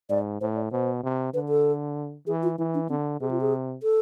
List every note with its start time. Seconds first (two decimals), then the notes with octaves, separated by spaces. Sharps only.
0.10 G#2 D5
0.41 A2 C5
0.56 D5
0.72 B2 C5
1.03 C3
1.33 D3 B4
1.49 A4
2.27 E3 G#4
2.43 F4
2.58 E3 E4
2.74 D4
2.89 D3 C4
3.20 C3 G#4
3.31 F4
3.41 G#4
3.83 A4